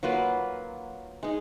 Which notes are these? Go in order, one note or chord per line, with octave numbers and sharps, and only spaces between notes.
F#3 A#3 F4 B4
G#3 D#4